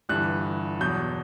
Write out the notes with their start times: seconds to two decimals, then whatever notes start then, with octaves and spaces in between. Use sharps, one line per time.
0.09 G1 G2 E3 F#6
0.80 E2 B2 F#3 G6